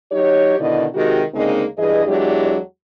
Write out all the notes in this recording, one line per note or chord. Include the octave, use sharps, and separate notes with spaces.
F#3 D#4 G4 C#5
B2 D3 D#3 E4 D5 D#5
C3 D#3 G#3 D#4 F#4 G4
D2 C#3 G#3 A#3 C4 D#4
G2 E3 G#4 D#5
E2 F#3 G#3 D4 E4 G4